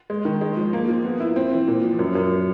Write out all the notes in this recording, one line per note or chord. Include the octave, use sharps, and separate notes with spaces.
G#3
D#3
G#3
F3
A#3
F3
B3
E4
C4
E3
A#2
F3
F#2
F#2